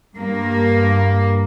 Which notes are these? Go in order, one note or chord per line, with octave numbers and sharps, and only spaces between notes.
G2 A#3